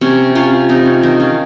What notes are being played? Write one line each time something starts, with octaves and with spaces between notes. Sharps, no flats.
C3 C#4
C3 C#4 F4
C3 C4 D#4
C#4
D#3 C4 D#4
C#4 F4